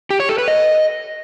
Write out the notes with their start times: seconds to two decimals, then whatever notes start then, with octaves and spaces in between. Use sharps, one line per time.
0.10 G4
0.20 C#5
0.29 A4
0.38 B4
0.48 D#5